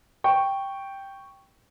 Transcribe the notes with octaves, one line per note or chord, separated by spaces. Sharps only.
G5 C#6